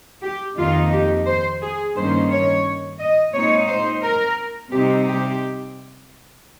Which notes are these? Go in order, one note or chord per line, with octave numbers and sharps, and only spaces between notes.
G4
F2 D#3 A#3 D#4 F4
G4
C5
G#4
G2 D#3 A#3 C#4 C5
C#5
D#5
A#2 G#3 C4 D#4 C#5
C5
A#4
C3 G3 C4 D#4 G4
G4